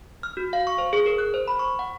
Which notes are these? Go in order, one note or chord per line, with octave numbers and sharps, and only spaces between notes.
F6
F#4
F5
C#6
C5
G#4
A#4
F#6
C5
B5
C#6
F#5